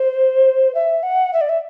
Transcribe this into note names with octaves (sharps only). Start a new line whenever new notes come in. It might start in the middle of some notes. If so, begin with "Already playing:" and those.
Already playing: C5
E5
F#5
E5
D5
E5